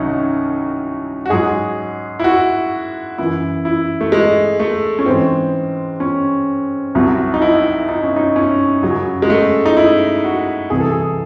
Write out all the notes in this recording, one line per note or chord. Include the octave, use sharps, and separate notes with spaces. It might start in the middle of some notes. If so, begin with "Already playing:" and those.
Already playing: C2 D#3 F#3 C#4 D#4
F#4
G#2 F#3 G#4
E4
F#4
F#2 E3 E4
E4
A3
G#3
A3
C#4
G#2 E3 C4
C#4
C2 C3 F#3
D#4
E4
D#4
C#4
D#4
C#4
F#2 C#3 F#3
G#3
A3
D#4
E4
F#4
C2 C3 E3 G#4
A4
G#4